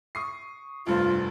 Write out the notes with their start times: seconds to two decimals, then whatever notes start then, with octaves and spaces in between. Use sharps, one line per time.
0.15 C#6 D#6 C7
0.87 F1 G2 F4 C5